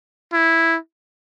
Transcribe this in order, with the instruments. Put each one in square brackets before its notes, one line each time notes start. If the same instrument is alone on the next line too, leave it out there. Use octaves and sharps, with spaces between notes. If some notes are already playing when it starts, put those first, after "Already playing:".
[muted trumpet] E4